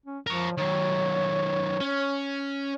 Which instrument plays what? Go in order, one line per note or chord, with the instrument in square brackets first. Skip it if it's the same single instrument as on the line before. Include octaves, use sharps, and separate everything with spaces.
[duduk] C#4
[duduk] F3 [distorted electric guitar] A#4 C#5
[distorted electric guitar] D#3 F#3 [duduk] C#5
[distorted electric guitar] C#4